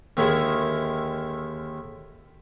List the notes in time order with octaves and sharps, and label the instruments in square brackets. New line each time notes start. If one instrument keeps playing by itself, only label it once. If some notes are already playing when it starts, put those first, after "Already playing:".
[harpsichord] D#2 D3 D#3 G#3 E4 G#4